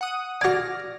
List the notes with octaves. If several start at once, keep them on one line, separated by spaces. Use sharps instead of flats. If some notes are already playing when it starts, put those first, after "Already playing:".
F#5 D#6
F#4 D5 G#5 F6 A#6